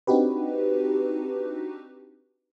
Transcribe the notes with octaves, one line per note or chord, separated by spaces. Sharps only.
C4 D4 D#4 F#4 G4 B4